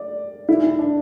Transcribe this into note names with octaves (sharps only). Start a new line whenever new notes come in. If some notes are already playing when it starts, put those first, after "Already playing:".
Already playing: D5
E4
E4
D4